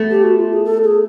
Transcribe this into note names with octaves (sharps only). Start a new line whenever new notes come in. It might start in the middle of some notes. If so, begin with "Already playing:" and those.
Already playing: A3 B3
G4
F#4
F4
G#4
A4
G#4